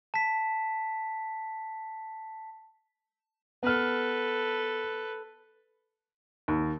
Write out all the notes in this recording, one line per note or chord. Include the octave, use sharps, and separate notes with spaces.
A5 B6
B3 A4 B4 F6
D#2